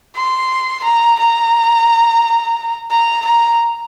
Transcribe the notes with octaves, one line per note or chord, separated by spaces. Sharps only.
C6
A#5
A#5
A#5
A#5